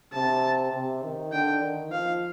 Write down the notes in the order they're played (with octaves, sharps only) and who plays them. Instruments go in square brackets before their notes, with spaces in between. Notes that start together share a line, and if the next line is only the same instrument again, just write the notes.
[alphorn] C3 [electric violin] A5
[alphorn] C3
D#3
[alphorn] D3 [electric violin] G5
[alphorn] D#3
[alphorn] F3 [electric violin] F5